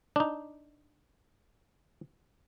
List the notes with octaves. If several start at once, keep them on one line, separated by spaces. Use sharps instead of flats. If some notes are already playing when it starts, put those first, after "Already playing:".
D4 D#4